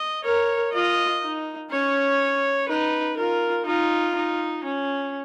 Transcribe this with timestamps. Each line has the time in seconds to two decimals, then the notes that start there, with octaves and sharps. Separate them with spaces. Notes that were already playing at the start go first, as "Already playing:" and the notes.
Already playing: D#5
0.24 A#4 C#5
0.73 F4 D#5
1.22 D#4
1.70 C#4 C#5
2.69 D#4 B4
3.17 F4 A#4
3.66 D#4 F4
4.15 D#4
4.64 C#4